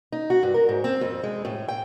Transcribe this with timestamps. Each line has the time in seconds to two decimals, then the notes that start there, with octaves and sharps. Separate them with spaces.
0.12 D#4
0.30 F#4
0.43 G2
0.54 A#4
0.69 G#2
0.84 C4
1.01 F2
1.23 G#3
1.45 A2
1.68 G5